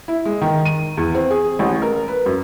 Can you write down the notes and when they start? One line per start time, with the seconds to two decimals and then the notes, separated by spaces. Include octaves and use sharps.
0.08 E4
0.25 G#3
0.41 D#3
0.65 D#7
0.97 E2
1.15 C4
1.30 G#4
1.59 A1
1.82 A#4
2.08 B4
2.26 F#2